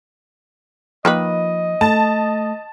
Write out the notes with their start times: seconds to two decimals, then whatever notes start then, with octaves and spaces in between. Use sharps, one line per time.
1.05 D#3 F3 A#3 B4 D#5
1.81 A3 A5